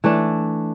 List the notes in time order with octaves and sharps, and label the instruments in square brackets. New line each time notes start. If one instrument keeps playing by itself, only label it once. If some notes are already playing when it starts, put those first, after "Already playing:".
[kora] E3 A3 D4